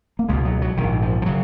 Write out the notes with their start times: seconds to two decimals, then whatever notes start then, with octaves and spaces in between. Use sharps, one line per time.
0.19 A#3
0.29 C#2 B2 G#3
0.45 F#3
0.62 F#3
0.77 A#1 G#2 D#3
1.02 F3
1.22 F3
1.26 C#3 F#3